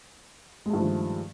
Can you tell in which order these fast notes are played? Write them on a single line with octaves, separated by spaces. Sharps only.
G#3 A3 G2 F3 D#3